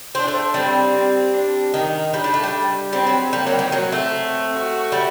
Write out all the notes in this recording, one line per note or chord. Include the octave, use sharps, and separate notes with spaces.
C4 D4
A3
G3 C4
C4
D4
D#3 D#4
G3 D4
G3
A3
G3
G3 C4
F#3
G3 A#3
F#3
D#3
F#3 C4
A3
F#4
G3